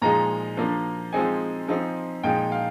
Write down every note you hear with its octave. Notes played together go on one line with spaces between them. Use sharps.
A#2 F3 G#3 D#4 A#5
F3 A#3 D4
F3 G#3 C4 D#4 G#5
F3 C4 D#4
A#2 F3 G#3 D#4 G5
F5